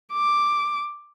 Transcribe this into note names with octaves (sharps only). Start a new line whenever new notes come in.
D6